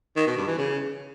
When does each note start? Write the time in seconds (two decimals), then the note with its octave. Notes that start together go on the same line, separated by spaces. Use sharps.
0.16 D#3
0.27 B2
0.37 G2
0.47 E3
0.58 C#3